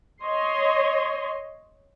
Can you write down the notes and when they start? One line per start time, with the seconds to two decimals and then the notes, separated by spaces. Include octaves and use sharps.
0.21 C#5 D#5 C6